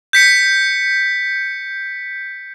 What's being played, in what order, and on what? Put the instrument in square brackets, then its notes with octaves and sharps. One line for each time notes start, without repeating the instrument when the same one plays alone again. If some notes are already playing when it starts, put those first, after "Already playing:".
[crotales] G6 B6 C#7